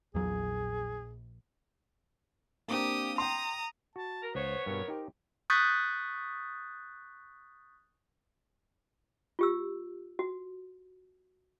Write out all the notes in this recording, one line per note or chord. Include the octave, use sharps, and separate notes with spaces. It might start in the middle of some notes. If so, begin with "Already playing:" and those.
A#1 E2 F#3 G#4
A#3 C4 D4 G4 D#6
G5 A#5 C6 D#6
F#4 A5
A#4
C#2 B3 C5 C#5
G2 B2 A#4
D#4 G4 C5
C#6 D#6 F#6 G6 A6 B6
F4 G4 E6
F#4